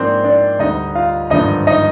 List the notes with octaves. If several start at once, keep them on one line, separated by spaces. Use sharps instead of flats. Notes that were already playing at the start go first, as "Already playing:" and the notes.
Already playing: G#2 F3 A#3 C4 D4 C5
D4 D5
D2 D3 G3 D#4 D#5
F4 F5
G#1 G2 D3 F3 D#4 D#5
D#4 D#5